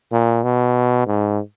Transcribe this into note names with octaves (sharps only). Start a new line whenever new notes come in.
A#2
B2
G#2